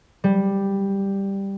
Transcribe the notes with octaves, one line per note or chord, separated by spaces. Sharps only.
G3